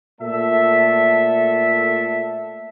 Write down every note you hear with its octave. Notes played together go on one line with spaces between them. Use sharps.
A#2 A3 A4 E5